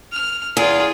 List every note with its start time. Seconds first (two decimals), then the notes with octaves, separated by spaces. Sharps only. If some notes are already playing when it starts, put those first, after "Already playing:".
0.12 F6
0.57 E2 F4 G#4